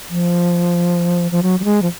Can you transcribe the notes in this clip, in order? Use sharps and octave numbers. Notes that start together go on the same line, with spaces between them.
F3
F3
F#3
F#3
G#3
F3